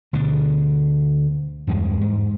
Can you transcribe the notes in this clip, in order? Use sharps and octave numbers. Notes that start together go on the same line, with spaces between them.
D2 B2 D3
E2 G2 G#3
G#2